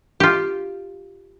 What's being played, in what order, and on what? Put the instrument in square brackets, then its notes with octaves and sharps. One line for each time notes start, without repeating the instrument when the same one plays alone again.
[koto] F4 G4